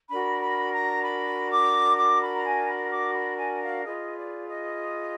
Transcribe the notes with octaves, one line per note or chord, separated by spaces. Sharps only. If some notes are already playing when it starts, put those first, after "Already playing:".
D4 F#4 A#4 B5
B5
A#5
B5
D6
D6
B5
A#5
G#5
B5
D6
B5
G#5
F5
F4 G#4 B4 D#5
D5
D#5